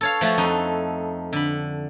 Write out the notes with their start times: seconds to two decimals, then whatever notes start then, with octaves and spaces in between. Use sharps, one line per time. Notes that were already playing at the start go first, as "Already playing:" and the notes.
0.01 A4 C#5 F5
0.21 F3 A3 F#4
0.38 F2 D#4
1.33 D3 B5